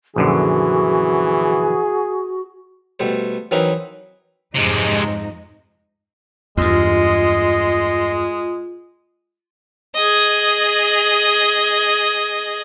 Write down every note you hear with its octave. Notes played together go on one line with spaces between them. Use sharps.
A#1 F#2 D3 E3 F#4 G#4
B2 G3 A3 C5
E3 F#3 C4 D#4 A#4 B4
F2 G#2 C3 G#3 D#4
E2 G2 G#3 F4 D#5 C6
G#4 D#5